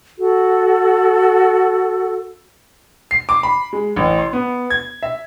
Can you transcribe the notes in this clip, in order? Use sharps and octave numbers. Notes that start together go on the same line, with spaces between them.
F#4 A4
C7
D6
B5
G#3
A1
C6
B3
G#6
E5